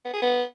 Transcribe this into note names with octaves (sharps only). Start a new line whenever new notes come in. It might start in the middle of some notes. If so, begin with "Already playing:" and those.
B3
G#4
B3